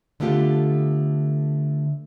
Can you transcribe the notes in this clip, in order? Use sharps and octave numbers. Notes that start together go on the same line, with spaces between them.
D3 A3 B3 F4 G4